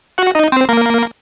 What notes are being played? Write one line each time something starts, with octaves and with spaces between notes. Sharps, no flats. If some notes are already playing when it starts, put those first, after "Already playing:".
F#4 F#5
D#4 D#5
C4 C5
A#3 A#4